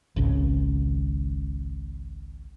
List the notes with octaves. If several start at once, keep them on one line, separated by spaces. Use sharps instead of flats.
G#1 C#2 C#3